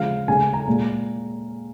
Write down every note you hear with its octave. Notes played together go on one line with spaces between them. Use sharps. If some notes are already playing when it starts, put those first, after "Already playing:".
Already playing: C#3 F3 G#3 F5
C#3 G#3 G#5
A#5
A#2 G#3 A#5